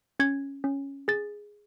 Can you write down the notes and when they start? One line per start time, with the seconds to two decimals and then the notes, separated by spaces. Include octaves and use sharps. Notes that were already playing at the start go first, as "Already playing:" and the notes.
0.19 C#4 G#6
0.64 C#4
1.08 G#4 A6